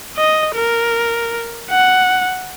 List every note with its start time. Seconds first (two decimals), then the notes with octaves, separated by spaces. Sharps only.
0.17 D#5
0.56 A#4
1.71 F#5